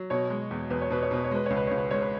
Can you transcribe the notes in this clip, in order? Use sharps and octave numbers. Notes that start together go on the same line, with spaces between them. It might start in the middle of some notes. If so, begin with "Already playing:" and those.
Already playing: F#3
B2 C#5
G#3
E2
E2 B4
C#5
B2 B4
C#5
B2 B4
C#5
G#3 B4
C#2 C#5
B4
C#2 C#5
B4
G#3 C#5
B4